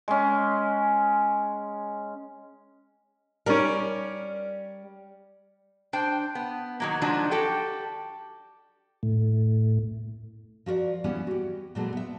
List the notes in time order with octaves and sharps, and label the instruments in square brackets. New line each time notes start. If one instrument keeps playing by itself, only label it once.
[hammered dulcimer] G#3 C#4
[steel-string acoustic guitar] G3 D5 [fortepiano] C#4 A#4
[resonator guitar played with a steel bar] D4 C5 G5
B3
D#3 F#3 A#3
D#3 F3 F#3 G#3 D4
F#4 G4 A4 G5
[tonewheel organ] A2
[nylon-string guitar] F3 F#4 A#4 D5
E3 G3 B3 C#4
F#4 G4
A#2 E3 F#3 G#3 A3
B3 E5